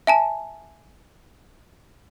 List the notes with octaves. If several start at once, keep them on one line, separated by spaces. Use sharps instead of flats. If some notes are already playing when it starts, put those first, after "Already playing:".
E5 G#5 A5